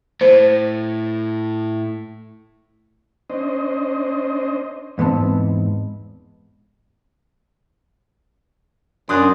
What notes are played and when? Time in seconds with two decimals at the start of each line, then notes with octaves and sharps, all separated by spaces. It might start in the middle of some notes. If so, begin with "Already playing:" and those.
0.21 A2 C5
3.30 C#4 D4 C5 D#5
4.98 E2 G#2 B3 C4 A5
9.09 F#2 D4 C6 D#6 F#6